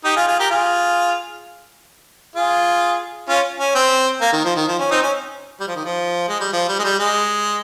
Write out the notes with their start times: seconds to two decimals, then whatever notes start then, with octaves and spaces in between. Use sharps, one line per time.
0.05 D#4 G4
0.16 F4 G#4
0.28 F4 G#4
0.39 G4 A#4
0.51 F4 G#4
2.36 F4 G#4
3.29 C#4 F4
3.59 C#4
3.75 C4
4.21 A#3
4.33 D#3
4.45 F3
4.56 D#3
4.68 F3
4.79 C#4
4.91 C4 D#4
5.03 C#4
5.60 G3
5.68 F3
5.76 D#3
5.84 F3
6.29 G#3
6.41 G3
6.53 F3
6.68 G3
6.79 G#3
6.84 G3
6.99 G#3